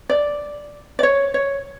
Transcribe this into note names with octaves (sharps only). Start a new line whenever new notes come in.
D5
D5
C#5
C#5